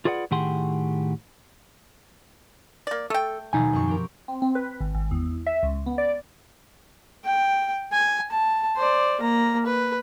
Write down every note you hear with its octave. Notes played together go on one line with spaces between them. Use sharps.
F4 G#4 B4 D5 F5 F#5
A2 D#3 G4 G#4 F#5 C6
A#3 D5
A3 A4 G5
D#2 B2 F3 F#3 D#4 G#5
F#2 C4 C#6
G4 A#4
C4
C4
B4
G#1
G#1
E2
E5
C#2
B3
D5
G5
G#5
A5
C5 D5
A#3 A#5
B4